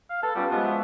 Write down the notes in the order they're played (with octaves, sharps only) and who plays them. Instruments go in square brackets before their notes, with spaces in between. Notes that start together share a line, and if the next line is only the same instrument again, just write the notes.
[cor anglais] F5
[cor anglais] A4 [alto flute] B4 [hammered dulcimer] A5
[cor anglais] G3 [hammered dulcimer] B3 C#4 G4 [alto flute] F4
[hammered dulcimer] F3 G#3 [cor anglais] B3
[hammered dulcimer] F#4 E5